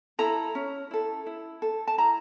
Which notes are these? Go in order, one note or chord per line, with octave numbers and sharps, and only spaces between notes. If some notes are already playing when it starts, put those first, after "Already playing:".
E4 A4 A#5
C#4
E4 A4
E4
A4
A5
E4 A#5